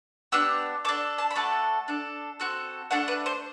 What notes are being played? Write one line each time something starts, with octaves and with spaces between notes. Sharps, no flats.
B3 D4 G4 E6
D4 A4 D6
A5
B5
A3 D4 F#4 A4 A5
D4 A4
C4 F#4 A4
A3 D4 A4 F#5
B4
C5